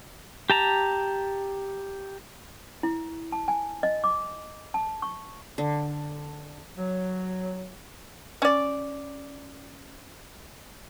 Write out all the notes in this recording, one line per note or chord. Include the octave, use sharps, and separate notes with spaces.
G4 A5 A#5
E4
A5
G#5
D#5
D6
A5
C#6
D3
F#3
C#4 D5